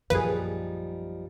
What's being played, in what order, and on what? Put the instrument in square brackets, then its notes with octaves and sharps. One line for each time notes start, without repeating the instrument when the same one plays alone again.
[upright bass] A#1 F#2 [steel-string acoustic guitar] F3 G3 D#4 [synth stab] A#3 G#4 [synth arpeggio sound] B4